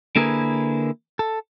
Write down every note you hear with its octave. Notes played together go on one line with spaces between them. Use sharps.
D3 A#3 E4 G#4 A#4 B4
A4